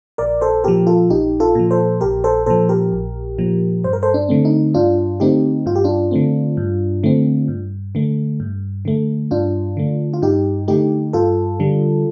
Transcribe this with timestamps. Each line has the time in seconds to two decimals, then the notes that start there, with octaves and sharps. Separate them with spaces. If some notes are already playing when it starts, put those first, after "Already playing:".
0.18 A#1 A#4 D5
0.41 A4 C5
0.64 A#2 F3 G4 A#4
0.87 F4 A4
1.09 A#1 D#4 G4
1.40 F4 A4
1.55 A#2 F3
1.71 A4 C5
2.01 A#1 G4 A#4
2.24 A4 C5
2.46 A#2 F3 A4 C5
2.69 G4 A#4
2.92 A#1
3.38 A#2 F3
3.84 G2 C5
3.93 A#4
4.03 A4 C5
4.14 D4
4.29 D3 A3 C4
4.45 D#4
4.74 G2 D4 F4
5.20 D3 A3 C4 D#4 G4
5.66 G2 F4
5.76 G4
5.84 D4 F4
6.11 D3 A3 C4
6.57 G2
7.03 D3 A3 C4
7.48 G2
7.95 D3 A3
8.40 G2
8.85 D3 A3
9.31 G2 D4 F4
9.77 D3 A3
10.14 F4
10.22 G2 D#4 G4
10.68 D3 A3 D#4 G4
11.13 G2 F4 A4
11.60 D3 G3